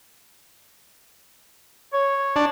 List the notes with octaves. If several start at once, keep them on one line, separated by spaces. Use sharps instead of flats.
C#5
D4